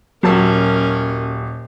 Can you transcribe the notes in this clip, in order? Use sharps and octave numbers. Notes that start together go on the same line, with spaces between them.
D#1 F#3 C#4 A#4 A5 E6